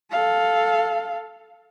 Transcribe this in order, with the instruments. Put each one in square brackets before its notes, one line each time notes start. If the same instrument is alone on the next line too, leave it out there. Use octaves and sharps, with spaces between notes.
[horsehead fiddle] A4 F5